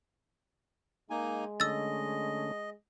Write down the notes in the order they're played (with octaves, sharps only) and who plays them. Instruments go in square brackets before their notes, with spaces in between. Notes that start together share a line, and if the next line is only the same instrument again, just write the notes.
[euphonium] G#3 [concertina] A#3 D#4 G#5
[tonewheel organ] D3 A3 C#4 [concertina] D#5 [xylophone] E6 A6